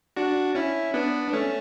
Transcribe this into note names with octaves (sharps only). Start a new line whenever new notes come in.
D4 F#4
C#4 E4
B3 D4
D4
A3 C#4